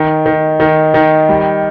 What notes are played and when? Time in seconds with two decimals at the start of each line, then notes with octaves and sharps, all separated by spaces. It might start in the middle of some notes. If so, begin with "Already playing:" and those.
Already playing: D#3
0.26 D#3
0.60 D#3
0.94 D#3
1.29 G3